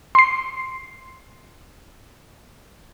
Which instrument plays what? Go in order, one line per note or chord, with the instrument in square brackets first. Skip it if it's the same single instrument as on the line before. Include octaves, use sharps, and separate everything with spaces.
[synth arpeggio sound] C6 C7